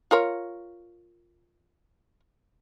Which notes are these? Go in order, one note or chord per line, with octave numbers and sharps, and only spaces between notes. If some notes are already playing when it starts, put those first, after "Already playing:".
F4 A#4 C#5